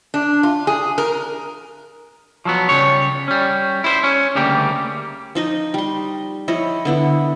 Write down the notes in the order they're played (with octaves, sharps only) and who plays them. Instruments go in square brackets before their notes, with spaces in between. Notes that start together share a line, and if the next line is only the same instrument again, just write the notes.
[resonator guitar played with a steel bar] D4
F4
G#4
A#4
[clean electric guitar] F3 F#3 B3
C#3 G3 C#5
G3 C#4
E4 C5
C#4
D2 C#3 G3 A#3 G4
[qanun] F3 D#4 D#5
G3 C6
F3 E4 C#5 D#5
D3 B3 E4